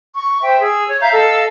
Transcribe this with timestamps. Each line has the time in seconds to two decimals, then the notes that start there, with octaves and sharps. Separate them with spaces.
0.15 C#6
0.42 C5 E5 G5
0.61 G#4 E6
0.88 C#5
1.01 E5 F5 A#5 G6
1.13 A4 D#5 F5 E6